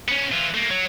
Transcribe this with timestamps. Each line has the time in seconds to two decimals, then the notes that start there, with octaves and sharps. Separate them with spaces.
0.08 B3 C#4
0.32 E3 F4
0.54 A3 A#3
0.71 F#3